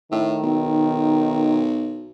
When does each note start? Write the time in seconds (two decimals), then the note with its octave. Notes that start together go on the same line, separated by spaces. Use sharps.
0.11 A2 D#3
0.43 B1